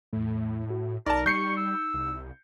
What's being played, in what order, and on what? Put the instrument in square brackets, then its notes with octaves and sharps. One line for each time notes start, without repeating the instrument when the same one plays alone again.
[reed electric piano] E2 A3 [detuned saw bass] A2
[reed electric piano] F#4
[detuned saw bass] B1 [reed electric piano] D#4 [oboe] A#4 [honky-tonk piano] D5 A5
[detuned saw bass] G3 [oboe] C#6 [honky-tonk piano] G6 C7 C#7
[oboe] E6
[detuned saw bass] C2